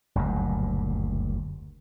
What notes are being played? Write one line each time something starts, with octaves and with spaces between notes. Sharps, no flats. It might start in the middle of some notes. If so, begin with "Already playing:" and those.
F#1 D2 G2 A#2